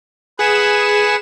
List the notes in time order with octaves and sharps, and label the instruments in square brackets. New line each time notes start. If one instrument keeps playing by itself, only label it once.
[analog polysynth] G#4 E7 [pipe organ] B4 F#5 G#5